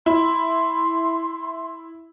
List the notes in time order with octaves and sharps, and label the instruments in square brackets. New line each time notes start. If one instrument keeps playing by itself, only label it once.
[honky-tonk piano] E4 [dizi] C6